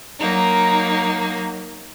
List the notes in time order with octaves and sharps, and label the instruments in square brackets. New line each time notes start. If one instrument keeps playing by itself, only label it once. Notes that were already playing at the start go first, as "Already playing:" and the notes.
[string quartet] F#3 A#3 D#4